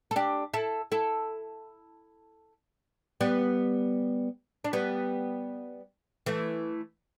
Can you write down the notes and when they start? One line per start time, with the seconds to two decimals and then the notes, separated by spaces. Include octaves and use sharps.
0.11 A4
0.16 D4 G4
0.54 E4 A4
0.92 E4 A4
3.21 G3 B3
4.64 D4
4.73 G3 B3
6.26 E3 A3